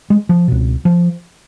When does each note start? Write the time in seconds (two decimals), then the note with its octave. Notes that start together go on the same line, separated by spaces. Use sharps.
0.10 G#3
0.29 F3
0.48 C#2 B2
0.85 F3